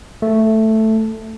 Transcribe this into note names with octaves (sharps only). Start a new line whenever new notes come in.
A3